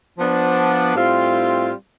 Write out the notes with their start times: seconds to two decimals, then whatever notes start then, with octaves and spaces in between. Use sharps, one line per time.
0.19 F3 B3 D4
0.95 A2 G3 C4 F4